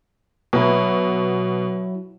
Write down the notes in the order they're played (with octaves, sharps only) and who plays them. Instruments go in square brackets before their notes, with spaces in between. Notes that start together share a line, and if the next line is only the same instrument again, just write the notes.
[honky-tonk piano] B2 [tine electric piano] F#3 E4